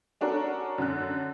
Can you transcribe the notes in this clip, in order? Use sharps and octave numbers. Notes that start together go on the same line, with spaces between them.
C#4 D4 F#4 A4 A#4
F#2 D3 F#6